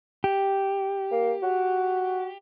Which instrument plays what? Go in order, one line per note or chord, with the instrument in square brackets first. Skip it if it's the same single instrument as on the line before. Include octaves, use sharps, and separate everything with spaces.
[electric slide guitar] G4
[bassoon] A#3
F#4